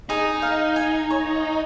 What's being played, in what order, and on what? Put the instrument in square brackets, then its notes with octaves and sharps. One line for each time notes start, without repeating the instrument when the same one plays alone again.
[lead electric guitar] D#4 [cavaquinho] G#4
[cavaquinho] F5
G#5
C#5